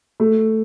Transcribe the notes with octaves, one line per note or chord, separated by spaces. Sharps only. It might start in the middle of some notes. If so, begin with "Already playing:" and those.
A3